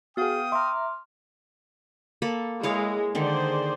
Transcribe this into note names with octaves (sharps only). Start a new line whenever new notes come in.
B3 F#4 G#4 F5 G5 D#6
E5 A#5 C6 D6 F6
A#3 A4 B5
G#3 E4 G#4 C#5 F5
D3 D#3 G#4 C5 D5